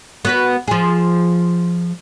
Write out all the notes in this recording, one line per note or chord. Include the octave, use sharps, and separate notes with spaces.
B3 F#4 B4
F3 G#4